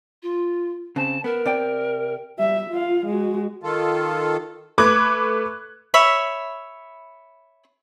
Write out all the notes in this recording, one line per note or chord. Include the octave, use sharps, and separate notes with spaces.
F4
C#3 C4 A5
B3 A#4
C3 D5 G5
G3 E5
F4 F5
G#3 F#4
D#3 F4 A4
A3 B4 D6 F#6 G#6
C#5 E5 B5